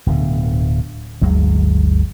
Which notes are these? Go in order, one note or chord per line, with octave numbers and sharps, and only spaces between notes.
D1 B2 D3
G1 D2 F#3 G#3